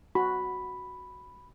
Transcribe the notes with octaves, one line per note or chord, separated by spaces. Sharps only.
F#4 B5